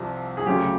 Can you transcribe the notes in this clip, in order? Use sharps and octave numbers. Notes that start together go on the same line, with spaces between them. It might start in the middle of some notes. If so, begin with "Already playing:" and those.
Already playing: C2 C3 F3
G#4
D2 C#3 F#3 G4